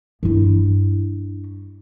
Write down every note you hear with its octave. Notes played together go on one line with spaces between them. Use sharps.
G2 E4